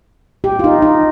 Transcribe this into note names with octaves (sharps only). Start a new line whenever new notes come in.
G4
F4
D#4
D#4